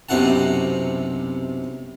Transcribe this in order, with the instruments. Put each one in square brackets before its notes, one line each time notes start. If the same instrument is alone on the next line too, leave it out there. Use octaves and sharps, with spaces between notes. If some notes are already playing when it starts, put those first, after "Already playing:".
[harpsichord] B1 F#2 C3 E4 F#5 A5